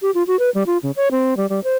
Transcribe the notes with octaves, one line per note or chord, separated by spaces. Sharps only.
G4
F4
F#4
B4
G3
F4
C#3
C#5
C4
G3
G3
C5